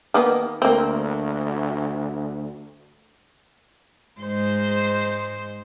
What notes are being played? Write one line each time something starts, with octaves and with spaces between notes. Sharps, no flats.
D#3 A#3 B3
D2 A#3 C4
G#2 G#3 C5